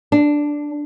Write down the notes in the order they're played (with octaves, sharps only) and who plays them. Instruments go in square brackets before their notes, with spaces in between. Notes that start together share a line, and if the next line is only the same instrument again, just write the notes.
[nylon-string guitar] D4